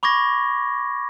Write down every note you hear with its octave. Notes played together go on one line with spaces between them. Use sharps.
B5 C#6 D6 G#6 A#6